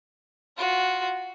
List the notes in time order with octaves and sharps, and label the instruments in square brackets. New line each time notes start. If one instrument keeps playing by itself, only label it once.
[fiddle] F4 F#4